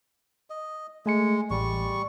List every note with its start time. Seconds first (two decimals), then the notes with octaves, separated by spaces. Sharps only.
0.50 D#5
1.06 G#3 A3 G#5 C#7
1.51 A1 G3 C#6